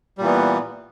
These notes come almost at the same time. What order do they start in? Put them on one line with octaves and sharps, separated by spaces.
G3 A#2 E3 B3